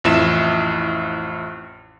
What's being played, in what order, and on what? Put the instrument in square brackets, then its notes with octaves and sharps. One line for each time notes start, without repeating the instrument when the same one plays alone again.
[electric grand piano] A1 F2 E4 E7